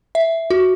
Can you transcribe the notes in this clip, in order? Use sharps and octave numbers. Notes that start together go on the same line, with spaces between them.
E5
F#4